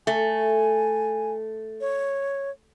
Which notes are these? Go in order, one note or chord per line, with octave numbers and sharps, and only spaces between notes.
A3 G#5
C#5